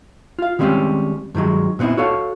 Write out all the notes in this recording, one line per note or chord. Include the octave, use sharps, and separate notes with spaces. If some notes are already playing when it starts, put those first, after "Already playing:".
F4 F5
D#3 G3 G#3 C4 C#4 G4
G2 D#3 F#3 G#3
A#2 B3 C4 D#4 E4
F#4 A4 C#5 F5